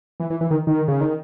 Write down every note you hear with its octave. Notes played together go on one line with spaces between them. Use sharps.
E3
E3
E3
D#3
D#3
C#3
D#3